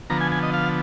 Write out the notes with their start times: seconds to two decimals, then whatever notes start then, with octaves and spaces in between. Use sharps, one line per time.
0.10 D3 F3 B3 A#5
0.21 G#5
0.32 G#5
0.43 D#5
0.54 F5